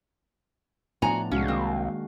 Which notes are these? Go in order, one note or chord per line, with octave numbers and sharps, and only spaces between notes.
A2 F3 B3 D4 F#4 G#5 A#5
C2 G#3 C#4 F#4 F5
D#3 A#3 C4